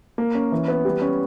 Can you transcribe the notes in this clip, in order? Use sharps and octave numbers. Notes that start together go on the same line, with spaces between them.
A#3
C#4
E3
B3
G3
C#4